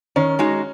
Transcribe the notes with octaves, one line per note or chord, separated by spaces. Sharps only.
D#3 C#4
G#3 D#4 F#4